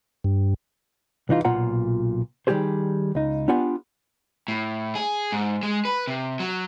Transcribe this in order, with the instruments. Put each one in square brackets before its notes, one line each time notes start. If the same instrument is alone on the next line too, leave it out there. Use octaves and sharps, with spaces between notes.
[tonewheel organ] G2
[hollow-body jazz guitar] C2 E3 D#4 F4
B1 A#2 F4 F#5 A#5
D#3 G3 A#3 G4 G#4 C5
C#2 D#4
B3 D4 F4 G4 F#5 G#5
[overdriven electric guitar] A2
G#4
G#2
G#3
B4
C3
F#3